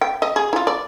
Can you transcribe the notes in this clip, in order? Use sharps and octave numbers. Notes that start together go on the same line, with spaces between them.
G5
D#5
G#4
E4 F4
D5